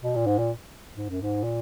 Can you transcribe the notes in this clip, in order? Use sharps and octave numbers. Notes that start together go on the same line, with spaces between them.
B2
A#2
G#2
A#2
G#2
F#2
G#2
A#2